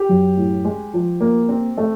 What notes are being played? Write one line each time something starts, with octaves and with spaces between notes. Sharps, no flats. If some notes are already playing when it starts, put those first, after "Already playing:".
Already playing: G4
F#2
A2
G#3
F3
A#3
C4
A3